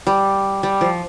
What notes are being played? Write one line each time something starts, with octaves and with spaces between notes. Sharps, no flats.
G3
G3
F3